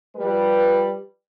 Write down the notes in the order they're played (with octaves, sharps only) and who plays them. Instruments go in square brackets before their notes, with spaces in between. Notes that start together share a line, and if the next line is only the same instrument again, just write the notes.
[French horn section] F3 G3 B4